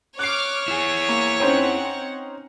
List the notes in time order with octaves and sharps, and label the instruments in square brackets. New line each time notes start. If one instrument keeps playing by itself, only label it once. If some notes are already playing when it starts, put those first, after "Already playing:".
[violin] C#5 [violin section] D6 F6 [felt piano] F#6 C7
[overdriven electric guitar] E4 G#4 [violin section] C#6
[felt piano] A#3
[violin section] C4 F#5 [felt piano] C#4 D#4 C5